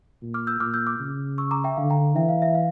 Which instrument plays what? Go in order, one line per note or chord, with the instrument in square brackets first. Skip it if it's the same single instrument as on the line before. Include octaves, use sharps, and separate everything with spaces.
[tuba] A#2
[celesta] D6 F6
E6 G6
[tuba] A#2 [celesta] D6 F6
[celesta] E6 G6
D6 F6
[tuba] C#3
[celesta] C#6 E6
A#5 D6
E5 G5
[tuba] D3 [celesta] F5
[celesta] G5 A#5
[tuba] E3 [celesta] E5 G5
[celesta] F5
E5
F5